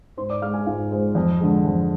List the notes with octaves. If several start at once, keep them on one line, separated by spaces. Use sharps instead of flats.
G#2 C5 C6
D5 D6
G#3 F5 F6
G#4 G#5
G#2 F4 F5
G#3 C5
F2
D3 G#3
F2